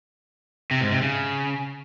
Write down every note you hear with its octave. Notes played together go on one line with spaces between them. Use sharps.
C3
G#2
C3
C#3